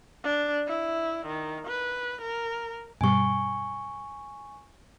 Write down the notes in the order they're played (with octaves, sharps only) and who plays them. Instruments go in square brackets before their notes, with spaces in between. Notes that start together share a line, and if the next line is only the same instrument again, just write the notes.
[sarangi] D4
E4
D#3
B4
A#4
[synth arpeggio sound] G2 B2 G3 [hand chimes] G#5 C#6